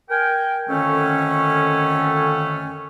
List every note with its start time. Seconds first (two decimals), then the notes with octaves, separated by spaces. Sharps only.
0.10 A#4 G5 G#5
0.69 F2 D3 D#3 A3 C#4